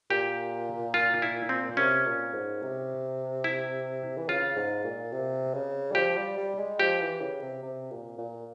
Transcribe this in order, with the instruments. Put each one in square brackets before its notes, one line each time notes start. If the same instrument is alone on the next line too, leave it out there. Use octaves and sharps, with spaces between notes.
[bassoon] A#2 [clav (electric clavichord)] G4
[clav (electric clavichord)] F4
E4
C4
[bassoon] C3 [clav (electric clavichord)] C#4
[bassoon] A#2
G#2
C3
[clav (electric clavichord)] E4
[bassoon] E3
[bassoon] C#3 [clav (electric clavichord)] F4
[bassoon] G#2
A#2
C3
C#3
G3
[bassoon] F3 [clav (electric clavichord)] G4
[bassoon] G3
G3
G#3
[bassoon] F3 [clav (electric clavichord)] G4
[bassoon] E3
C#3
C3
C3
A#2
A#2